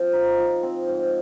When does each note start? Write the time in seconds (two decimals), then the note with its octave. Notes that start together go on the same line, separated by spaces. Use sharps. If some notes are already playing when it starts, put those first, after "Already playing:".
Already playing: F3 C4
0.13 D#4
0.38 F3
0.63 C4
0.87 G#2